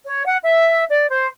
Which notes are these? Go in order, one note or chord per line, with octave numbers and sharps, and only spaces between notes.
C#5
F#5
E5
D5
C5